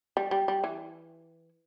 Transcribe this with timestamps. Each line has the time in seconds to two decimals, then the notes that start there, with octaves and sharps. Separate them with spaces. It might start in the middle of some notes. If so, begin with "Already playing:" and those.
0.17 G3
0.31 G3
0.48 G3
0.64 E3